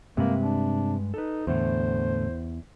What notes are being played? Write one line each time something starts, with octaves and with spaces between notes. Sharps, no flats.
G2 C3 G#3 A#3 B4
D4
D#4 A4 B4
E2 A2 D3 A3 C5